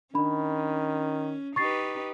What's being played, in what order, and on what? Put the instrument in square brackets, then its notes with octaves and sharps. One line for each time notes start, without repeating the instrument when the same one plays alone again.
[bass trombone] D#3 [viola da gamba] C#4 [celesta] D4 B5
[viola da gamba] D#4 G4 B4 [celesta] C#6 A6 C7